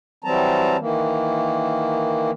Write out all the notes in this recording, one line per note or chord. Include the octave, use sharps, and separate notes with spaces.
E3 F#3 G3 C4 A5 A#5
D#3 E3 A#3